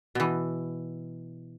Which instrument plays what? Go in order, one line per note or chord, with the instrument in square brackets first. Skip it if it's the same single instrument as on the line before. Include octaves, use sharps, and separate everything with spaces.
[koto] B2 E3